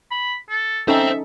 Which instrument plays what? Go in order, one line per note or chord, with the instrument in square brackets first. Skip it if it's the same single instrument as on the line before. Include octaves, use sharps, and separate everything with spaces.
[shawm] B5
A4
[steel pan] C#4 D#4 A4 [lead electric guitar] C5 G5 [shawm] E5